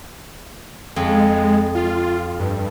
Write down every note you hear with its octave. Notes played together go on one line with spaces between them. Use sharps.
F2 G#3
F4
G2